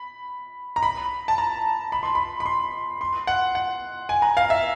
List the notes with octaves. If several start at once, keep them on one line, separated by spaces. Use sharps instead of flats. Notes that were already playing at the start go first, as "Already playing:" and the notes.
Already playing: B5
A#5
B5
A5
A#5
B5
C6
B5
B5
C6
C6
F#5
F#5
G#5
A#5
F5
E5